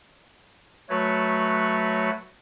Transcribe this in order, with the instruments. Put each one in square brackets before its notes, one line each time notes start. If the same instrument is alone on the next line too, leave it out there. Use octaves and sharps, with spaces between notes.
[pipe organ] F#3 A3 F#4 B4 C#5